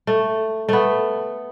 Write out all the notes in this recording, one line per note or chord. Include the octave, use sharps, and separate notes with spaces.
A3
A3 B3